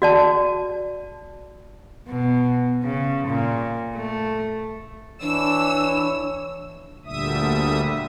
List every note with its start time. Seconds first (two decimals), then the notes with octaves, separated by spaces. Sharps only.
0.02 F#4 D5 A5
2.08 B2
2.83 C#3
3.27 A#2
3.95 A3
5.22 E3 D4 C#5 E6
7.05 D2 A#2 D3 G3 E5 D#6